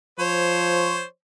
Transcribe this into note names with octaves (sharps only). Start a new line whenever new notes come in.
F3 C5 C#5